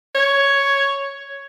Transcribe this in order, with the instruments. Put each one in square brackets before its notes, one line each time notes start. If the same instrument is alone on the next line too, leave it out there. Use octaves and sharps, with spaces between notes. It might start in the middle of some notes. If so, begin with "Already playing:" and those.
[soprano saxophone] C#5